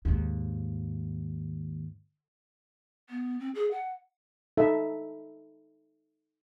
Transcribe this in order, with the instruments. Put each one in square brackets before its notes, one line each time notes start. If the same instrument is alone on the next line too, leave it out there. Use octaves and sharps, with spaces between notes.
[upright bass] D#2 G#2
[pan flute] B3
C4
G#4
F#5
[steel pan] D#4 A4 E5